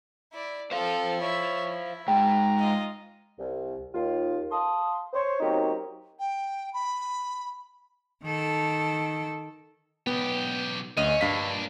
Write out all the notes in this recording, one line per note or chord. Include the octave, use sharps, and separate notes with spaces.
E4 D5
C4 A4 C5 F5
E4 C#5 E5
E4
G#2 G#3 G5 A#5
F4 D#5
C2
D#2 F4
F5 A5 C6 D#6
C5 C#5
F#3 A#3 C4 C#4 D#4 G4
G5
B5
D#3 A4
B1 B3 G4
D2 C#4 D#5
G2 A#3 D4 F5 B6